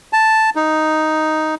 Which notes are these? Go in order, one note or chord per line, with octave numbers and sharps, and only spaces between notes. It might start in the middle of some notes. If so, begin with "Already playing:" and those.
A5
D#4